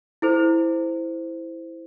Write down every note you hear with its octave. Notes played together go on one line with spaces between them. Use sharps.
E4 A4 C5